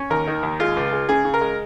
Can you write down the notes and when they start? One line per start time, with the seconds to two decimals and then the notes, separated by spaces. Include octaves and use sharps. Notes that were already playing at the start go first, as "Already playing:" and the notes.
Already playing: C#4
0.10 D#2 A#4
0.28 D#3
0.43 D#2
0.60 G#3 F4
0.77 C#2
0.93 G#3
1.09 C#3 G#4
1.25 C#3
1.34 A#4
1.41 G#3